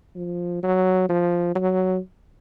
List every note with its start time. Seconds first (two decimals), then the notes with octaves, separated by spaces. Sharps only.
0.16 F3
0.63 F#3
1.09 F3
1.55 F#3